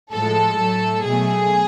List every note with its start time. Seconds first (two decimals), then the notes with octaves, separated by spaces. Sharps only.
0.12 A2 F3 G#3 A4
0.59 A2 F#3 A3
1.05 B2 F#3 A3 G#4